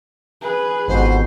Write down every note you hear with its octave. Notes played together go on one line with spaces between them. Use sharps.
G#4 B4
G#1 F2 G#2 B2 C5